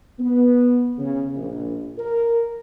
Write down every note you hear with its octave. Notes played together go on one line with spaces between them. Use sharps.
B3
C#3
A#1
A#4